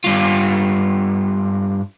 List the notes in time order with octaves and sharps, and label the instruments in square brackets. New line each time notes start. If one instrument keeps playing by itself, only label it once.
[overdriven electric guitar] G2 F4